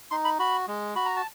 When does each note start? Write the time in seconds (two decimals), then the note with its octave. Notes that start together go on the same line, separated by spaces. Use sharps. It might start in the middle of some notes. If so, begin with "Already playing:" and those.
0.11 D#4 C6
0.25 B5
0.39 F#4 B5
0.68 G#3
0.95 F#4 B5
1.06 A#5
1.16 A5